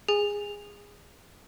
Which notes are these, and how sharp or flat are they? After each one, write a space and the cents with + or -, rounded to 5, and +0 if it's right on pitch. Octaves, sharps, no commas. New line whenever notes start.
G#4 -15 G#5 -15